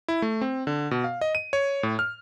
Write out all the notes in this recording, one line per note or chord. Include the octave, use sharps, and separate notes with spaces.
E4
A3
C4
D3
B2
F5
D#5
D#7
C#5
A2
F6